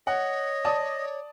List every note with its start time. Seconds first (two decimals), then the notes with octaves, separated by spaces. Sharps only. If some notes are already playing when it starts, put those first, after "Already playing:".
0.07 C#5 D#5 F#5
0.65 D5 A5 D#6